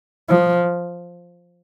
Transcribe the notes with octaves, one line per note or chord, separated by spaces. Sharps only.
F3